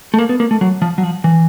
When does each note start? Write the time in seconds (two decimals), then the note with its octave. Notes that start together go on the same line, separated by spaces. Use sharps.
0.14 A3
0.18 A#3
0.29 B3
0.40 A#3
0.51 A3
0.61 F#3
0.82 F3
0.98 F#3
1.03 F3
1.24 E3